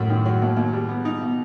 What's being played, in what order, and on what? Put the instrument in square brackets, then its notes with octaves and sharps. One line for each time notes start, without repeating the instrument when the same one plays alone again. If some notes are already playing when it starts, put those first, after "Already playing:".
Already playing: [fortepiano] F#2 [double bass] A2
[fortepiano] D#3
F#3
D#2
D#2
G3
B3
D#4
B2